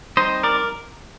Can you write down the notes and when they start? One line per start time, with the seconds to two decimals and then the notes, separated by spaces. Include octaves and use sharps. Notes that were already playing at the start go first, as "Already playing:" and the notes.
0.17 G3 C4 D#4 C5 D#5
0.43 A#4 D5